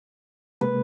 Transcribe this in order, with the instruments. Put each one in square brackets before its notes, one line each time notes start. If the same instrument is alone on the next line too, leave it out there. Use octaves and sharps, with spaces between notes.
[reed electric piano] C3 G#3 A#3 [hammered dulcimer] B4